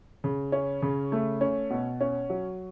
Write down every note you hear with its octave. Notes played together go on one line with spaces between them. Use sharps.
C#3
C#4
C#3
A3
C#4
B2
C#4
F#3